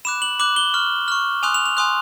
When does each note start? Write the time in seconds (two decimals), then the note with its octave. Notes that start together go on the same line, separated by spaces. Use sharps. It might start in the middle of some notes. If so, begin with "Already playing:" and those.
0.05 B5 D6 F#6 E7
0.22 F#7
0.39 B5 D6 F#6 F#7
0.56 G7
0.74 C#6 F6
1.08 C#6 F6
1.43 G#5 C6 D#6 F#6 F7
1.54 F7
1.66 F7
1.77 G#5 C6 D#6 F#6